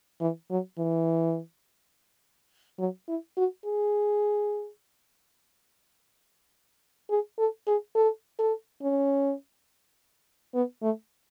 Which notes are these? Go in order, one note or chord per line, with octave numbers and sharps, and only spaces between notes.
E3
F#3
E3
F#3
E4
F#4
G#4
G#4
A4
G#4
A4
A4
C#4
B3
A3